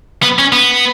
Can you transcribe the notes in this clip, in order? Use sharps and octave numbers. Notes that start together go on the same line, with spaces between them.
B3
C#4
B3